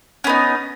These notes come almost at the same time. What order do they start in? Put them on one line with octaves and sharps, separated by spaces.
C#4 B3 D#4